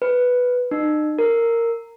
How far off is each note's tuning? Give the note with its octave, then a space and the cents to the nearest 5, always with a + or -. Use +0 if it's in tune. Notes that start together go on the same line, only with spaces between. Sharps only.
B4 +0
D#4 -40
A#4 -10